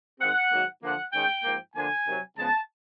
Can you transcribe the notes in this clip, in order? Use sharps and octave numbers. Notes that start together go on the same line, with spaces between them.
D#3 G#3 C4 F#5
G#2 D#3 F#3 A#3
D3 F3 A#3 D4 F#5
D#3 G#3 C#4 G5
G#2 F3 A#3
D3 F3 A#3 D4 G#5
C3 D#3 F#3
C#3 F3 G#3 B3 A5